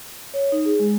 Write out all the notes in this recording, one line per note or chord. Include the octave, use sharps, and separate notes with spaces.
C#5
D#4
G#4
G#3